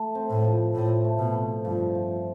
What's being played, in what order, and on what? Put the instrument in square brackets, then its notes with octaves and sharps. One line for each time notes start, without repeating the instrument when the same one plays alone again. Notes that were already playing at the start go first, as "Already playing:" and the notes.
Already playing: [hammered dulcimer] A3
C4
[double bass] A2
[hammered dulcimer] F3
[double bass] A2 [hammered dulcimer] F3
[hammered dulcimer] A3
[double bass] B2
[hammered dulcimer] C4
[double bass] G2 [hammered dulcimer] F3
[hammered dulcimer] F3